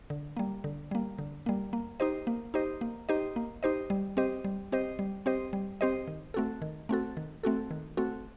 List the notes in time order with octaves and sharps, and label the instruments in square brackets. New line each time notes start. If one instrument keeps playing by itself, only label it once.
[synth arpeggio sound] D3
G3 A#3
D3
G3 A#3
D3
G3 A#3
A#3
D#4 G4 C5 D#5
A#3
D#4 G4 C5 D#5
A#3
D#4 G4 C5 D#5
A#3
D#4 G4 C5 D#5
G3
C4 G4 C5 D#5
G3
C4 G4 C5 D#5
G3
C4 G4 C5 D#5
G3
C4 G4 C5 D#5
D#3
A3 C4 F#4 A4
D#3
A3 C4 F#4 A4
D#3
A3 C4 F#4 A4
D#3
A3 C4 F#4 A4